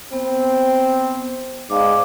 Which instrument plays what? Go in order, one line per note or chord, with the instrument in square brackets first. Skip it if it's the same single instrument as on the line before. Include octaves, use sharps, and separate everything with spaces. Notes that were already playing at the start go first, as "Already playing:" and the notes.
[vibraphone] B3 [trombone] C4
[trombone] G#2 [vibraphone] D5 F5 D6